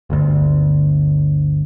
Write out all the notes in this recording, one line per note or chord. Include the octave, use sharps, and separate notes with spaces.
G1 D2